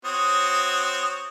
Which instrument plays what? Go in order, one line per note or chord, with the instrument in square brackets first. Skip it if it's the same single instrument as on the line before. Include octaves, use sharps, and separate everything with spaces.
[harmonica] C4 F#4 C#5 [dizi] D#6